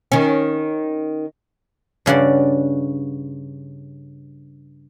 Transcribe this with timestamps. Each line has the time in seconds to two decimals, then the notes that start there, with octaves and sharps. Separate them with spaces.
0.12 D#3 C#4
2.06 G2 C#3 F#4 D5